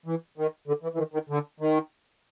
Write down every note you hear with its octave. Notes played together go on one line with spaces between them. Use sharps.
E3
D#3
D3
E3
E3
D#3
D#3
D3
D#3